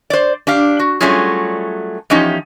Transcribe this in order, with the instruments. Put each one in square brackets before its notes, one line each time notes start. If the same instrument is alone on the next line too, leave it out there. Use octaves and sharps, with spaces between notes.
[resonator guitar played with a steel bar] C5 D5
D4 G4 F5
F#4
F#3 G3 A3 C#4 F4 G#4
E2 F3 C#4 D#4 G4